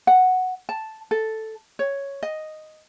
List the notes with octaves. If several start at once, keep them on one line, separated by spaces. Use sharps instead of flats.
F#5
A5
A4
C#5
D#5